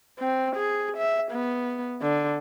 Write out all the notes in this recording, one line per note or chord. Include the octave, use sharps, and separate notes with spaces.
C4
G#4
E5
B3
D3